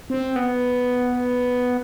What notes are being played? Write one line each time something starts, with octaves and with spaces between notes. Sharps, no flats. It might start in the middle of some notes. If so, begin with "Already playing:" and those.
C4
B3